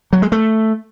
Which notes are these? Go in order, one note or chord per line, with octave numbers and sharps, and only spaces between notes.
F#3
G#3
A3